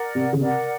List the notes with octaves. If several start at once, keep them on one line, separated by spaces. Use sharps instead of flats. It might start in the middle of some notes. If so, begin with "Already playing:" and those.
Already playing: A#4 D5 F#5
C3
C#3
C3 A#4 D5 F#5